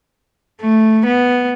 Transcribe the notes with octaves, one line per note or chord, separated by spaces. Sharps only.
A3
B3